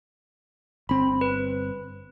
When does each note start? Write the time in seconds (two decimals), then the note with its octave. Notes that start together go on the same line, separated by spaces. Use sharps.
0.89 G1 C4 B5
1.21 B4